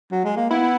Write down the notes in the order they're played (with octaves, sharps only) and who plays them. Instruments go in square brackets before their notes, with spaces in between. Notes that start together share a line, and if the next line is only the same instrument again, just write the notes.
[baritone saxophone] F#3
G#3
A#3
[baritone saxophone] B3 [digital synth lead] E4